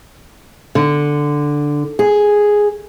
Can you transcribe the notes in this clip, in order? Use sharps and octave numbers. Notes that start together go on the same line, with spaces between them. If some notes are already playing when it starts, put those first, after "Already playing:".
D3
G#4